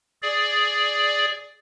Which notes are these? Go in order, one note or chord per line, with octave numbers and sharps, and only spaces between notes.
G#4 D5